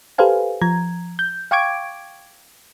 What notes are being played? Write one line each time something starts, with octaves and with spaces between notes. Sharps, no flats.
G4 A4 B4 C5 F5 G#5
F3 A#5 G#6
G6
F5 G5 C#6 D6 G#6 D7